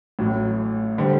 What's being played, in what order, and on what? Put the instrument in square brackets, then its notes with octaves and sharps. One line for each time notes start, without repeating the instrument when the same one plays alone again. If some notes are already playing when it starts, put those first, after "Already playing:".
[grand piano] A1 A2 F#3
D3 G3 C4